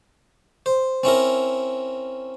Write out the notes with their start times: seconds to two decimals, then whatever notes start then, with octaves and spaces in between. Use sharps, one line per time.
0.66 C5
1.03 C4 C#4 E4 A#4